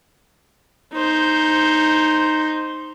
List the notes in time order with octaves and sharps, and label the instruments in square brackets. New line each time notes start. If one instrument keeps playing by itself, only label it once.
[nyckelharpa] D#4 C5